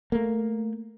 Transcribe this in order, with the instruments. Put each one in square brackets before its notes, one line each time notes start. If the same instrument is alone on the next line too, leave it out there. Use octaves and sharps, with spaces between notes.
[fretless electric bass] A3 A#3